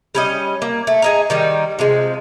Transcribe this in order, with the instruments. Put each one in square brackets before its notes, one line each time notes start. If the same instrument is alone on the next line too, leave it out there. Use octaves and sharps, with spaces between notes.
[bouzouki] G3 C#4 D#5
A#3
A3
G#4 D#5 A#5
D#3 G3 D#4
C3 F3 G#3